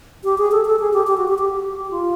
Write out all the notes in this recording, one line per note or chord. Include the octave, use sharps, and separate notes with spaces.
G4
G#4
A4
A4
G#4
G4
G4
F#4
G4
G4
F4